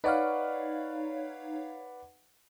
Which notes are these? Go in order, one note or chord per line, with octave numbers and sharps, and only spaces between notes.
D#4 B4 C#5 D5 F5 F#5